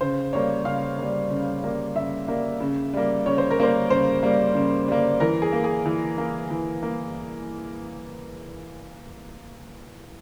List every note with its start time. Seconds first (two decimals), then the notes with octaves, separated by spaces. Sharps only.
0.01 C#3 C5
0.33 G3 A#3 C#5
0.65 C#3 F5
0.98 G3 A#3
1.30 C#3
1.63 G3 A#3
1.96 C#3 E5
2.28 G3 A#3
2.60 C#3
2.93 G3 A#3
3.26 C#3 C#5
3.38 C5
3.51 A#4
3.58 G3 A#3 C5
3.90 C#3 C5
4.23 G3 A#3
4.55 C#3
4.88 G3 A#3
5.20 E3 A#4
5.42 G#4
5.52 A#3
5.64 G#4
5.86 E3
6.18 A#3
6.50 E3
6.83 A#3